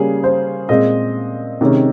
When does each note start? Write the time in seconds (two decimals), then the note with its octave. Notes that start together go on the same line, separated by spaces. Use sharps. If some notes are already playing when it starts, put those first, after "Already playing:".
Already playing: C#3 G3 A#3 C#4 G#4
0.24 C5
0.69 A#2 G#3 C4 D#5
1.61 C3 D#3 G#3 C#4